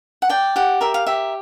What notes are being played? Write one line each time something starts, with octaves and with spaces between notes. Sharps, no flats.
F#5
D5 G5
G4 F#5
A#4 E5
F5
G4 E5